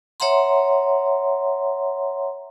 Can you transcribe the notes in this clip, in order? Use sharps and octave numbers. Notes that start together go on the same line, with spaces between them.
C#5 E5 F#5 A#5 C6